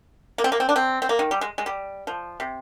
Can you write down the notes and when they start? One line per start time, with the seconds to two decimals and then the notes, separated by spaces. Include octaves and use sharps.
0.38 A#3
0.44 C4
0.52 A#3
0.60 C4
0.69 D4
0.76 C4
1.02 C4
1.09 A#3
1.19 D#3
1.31 G3
1.41 G#3
1.58 G#3
1.66 G3
2.07 F3
2.40 C3